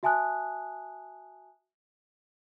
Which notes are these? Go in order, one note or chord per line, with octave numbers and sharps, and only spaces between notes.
F#4 E5 G#5 A5 D#6 F#6